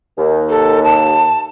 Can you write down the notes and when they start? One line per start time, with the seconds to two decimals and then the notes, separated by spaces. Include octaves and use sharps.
0.18 D#2
0.50 A4
0.84 A5